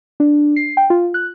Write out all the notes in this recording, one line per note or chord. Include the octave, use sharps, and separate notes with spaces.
D4
C7
G5
F4
F#6